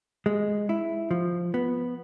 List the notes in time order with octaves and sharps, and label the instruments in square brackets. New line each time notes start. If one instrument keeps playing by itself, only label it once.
[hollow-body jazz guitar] G#3
E4
F3
B3